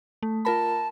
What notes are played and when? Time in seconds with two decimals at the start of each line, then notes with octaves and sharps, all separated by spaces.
0.23 A3
0.45 F4 A#4 A5 B5